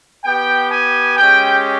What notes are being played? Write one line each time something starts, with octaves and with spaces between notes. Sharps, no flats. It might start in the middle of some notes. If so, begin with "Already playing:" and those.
B3 G4 G5
G#5
G#3 C#4 G4 G5